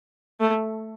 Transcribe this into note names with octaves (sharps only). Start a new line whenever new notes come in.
A3